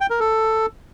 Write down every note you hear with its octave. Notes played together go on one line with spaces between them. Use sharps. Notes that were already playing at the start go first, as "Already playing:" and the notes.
G5
A#4
A4